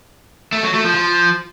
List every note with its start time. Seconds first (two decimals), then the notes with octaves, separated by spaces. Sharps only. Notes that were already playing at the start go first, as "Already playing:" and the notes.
0.52 A3
0.63 F#3
0.74 A3
0.84 F3
0.95 F3